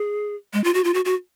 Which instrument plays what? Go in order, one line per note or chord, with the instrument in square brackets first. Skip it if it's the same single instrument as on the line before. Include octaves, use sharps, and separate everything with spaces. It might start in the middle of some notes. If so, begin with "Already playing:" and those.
Already playing: [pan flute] G#4
G#3
F4
F#4
F4
F#4
F#4